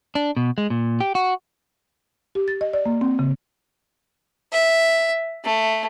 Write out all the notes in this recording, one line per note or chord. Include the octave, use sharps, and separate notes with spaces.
D4
B2
G#3
A#2
G4
F#4
G4
A6
D#5
D5
A#3
C4
C#3
E5
A3